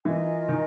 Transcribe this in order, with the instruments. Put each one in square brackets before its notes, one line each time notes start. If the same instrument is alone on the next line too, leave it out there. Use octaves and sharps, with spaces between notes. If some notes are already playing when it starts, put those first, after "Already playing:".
[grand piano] E3 [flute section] F4 A#4 D#5 G#5
[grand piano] D#3